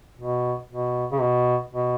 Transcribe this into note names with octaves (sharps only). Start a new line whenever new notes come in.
B2
B2
C#3
B2
B2